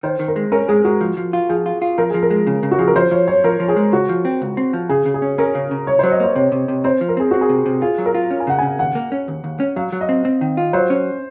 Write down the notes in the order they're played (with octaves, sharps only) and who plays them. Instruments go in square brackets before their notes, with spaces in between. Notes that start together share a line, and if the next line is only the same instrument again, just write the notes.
[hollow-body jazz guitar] D#3 [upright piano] C5
[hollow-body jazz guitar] D#3
[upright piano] A#4
[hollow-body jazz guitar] G#3
[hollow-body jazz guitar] C#4 [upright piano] A#4
[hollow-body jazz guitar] G#3 [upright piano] G#4
[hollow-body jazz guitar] G#3 [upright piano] F#4
[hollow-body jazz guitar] F3
F3
F4
[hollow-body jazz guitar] F3 [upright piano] G#4
[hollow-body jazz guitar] F4
F4
[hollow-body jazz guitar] F3 [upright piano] A#4
[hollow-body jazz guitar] F3 [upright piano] G#4
[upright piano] A#4
[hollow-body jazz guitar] G#3
C#3
C#3
[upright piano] F#4
[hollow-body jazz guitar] F3 [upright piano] G#4
[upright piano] A#4
[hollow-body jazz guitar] F3 [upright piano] C5
[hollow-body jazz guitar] F3 [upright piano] C#5
[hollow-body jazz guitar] F#2 [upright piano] C#5
[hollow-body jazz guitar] F3 [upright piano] A#4
[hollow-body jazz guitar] F3
[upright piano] G#4
[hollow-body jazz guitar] G#3
[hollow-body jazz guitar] C#2 [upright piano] F#4
[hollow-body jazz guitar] F3
C4
C#2
C4
F3
[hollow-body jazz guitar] C#3 [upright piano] G#4
[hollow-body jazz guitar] C#3
[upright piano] G#4
[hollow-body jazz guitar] C#4
[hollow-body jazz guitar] C#4 [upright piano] A#4
[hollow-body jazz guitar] C#3
C#3
[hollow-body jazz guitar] C2 [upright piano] C#5
[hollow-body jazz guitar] F#3 [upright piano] C5
[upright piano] D#5
[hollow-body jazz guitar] A#3 [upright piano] C5
[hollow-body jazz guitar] C3 [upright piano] C#5
[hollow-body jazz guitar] C3
C3
[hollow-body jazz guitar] C4 [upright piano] C5
[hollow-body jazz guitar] F3
[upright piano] A#4
[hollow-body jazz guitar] C4 [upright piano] G#4
[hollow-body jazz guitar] C4 [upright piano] F#4
[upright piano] G#4
[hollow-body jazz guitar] C3
C3
[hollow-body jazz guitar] F4 [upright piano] G#4
[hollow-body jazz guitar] F#3
[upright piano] A#4
[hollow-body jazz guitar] F4
C#4
[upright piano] G#5
[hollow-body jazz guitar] C#3 [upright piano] F#5
[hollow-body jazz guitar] C#3 [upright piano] G#5
[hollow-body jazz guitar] D#2 [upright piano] F#5
[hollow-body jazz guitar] A#3
C#4
D#2
D#2
C#4
[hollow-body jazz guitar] F#3 [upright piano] F5
[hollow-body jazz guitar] F#3
[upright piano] D#5
[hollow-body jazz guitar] C4
C4
D#3
F4
[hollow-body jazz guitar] F#3 [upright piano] C5
[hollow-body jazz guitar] C#4